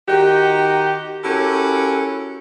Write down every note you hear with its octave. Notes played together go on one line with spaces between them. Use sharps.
D#3 D#4 F#4 G4
C#4 E4 F#4 G4 A4 A#4